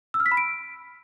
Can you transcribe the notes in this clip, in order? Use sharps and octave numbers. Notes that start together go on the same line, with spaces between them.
E6
F6
B6
B5
D7